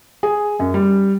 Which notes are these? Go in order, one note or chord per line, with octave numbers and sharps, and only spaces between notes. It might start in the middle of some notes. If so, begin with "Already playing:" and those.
G#4
F#2
G3